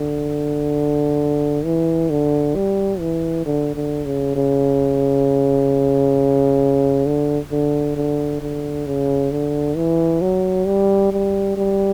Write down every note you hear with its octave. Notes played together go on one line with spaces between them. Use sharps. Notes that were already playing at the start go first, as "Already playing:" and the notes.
Already playing: D3
E3
D3
G3
E3
D3
D3
C#3
C#3
D3
D3
D3
D3
C#3
D3
E3
F#3
G3
G3
G3